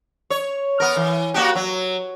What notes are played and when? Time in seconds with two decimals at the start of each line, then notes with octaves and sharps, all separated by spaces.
0.30 C#5
0.80 B3 A#4
0.96 E3
1.34 A#3 F#4 G4
1.55 F#3